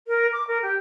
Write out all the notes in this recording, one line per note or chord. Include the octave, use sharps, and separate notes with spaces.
A#4
D6
A#4
G4